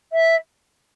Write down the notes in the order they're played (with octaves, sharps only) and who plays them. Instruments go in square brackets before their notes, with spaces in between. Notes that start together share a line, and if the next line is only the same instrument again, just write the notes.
[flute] E5